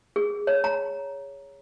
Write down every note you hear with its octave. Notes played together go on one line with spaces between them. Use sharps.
G#4
C#5
A#5